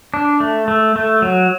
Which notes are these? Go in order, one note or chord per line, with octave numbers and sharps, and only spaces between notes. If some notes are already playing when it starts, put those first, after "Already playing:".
D4
A3
A3
A3
F#3